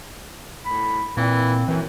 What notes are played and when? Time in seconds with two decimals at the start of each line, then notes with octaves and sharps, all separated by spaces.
0.65 A2 B5
1.17 A#2 E3 C4
1.68 F#2 E3